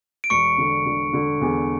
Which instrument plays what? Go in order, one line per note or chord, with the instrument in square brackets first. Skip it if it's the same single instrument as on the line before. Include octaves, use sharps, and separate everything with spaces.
[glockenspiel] D7
[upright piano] E1 [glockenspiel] C#6 C#7
[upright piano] D3
D3
D3
E2